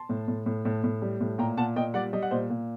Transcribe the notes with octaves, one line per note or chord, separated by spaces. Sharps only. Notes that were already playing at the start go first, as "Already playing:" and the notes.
Already playing: A5 C6
A2
A2
A2
A2
A2
G3
A2
A#2 G5 A#5
A#2 F#5 A5
A#2 D#5 G5
G3 D5 F#5
G3 D#5
F#5
A#2 C5 D#5
A#2